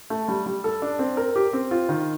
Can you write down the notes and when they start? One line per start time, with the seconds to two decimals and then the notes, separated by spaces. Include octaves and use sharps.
0.10 A3
0.28 G3
0.46 G3
0.64 A4
0.82 D4
0.99 C4
1.17 A#4
1.36 G4
1.53 C4
1.71 F4
1.89 D#3